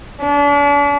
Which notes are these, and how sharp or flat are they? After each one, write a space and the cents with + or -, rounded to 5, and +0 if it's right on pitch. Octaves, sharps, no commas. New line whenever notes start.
D4 -40